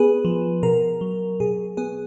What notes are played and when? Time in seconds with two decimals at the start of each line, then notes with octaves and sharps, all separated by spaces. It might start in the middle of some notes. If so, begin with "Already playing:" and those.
Already playing: B3 G#4 B4
0.25 F3
0.63 B2 A#4
1.01 F#3
1.40 B2 G#4
1.77 B3 G#4